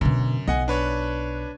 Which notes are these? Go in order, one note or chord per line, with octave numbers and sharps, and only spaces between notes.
F#2 B2 D3
B1 D#5 F#5 G#5
D4 B4 C#5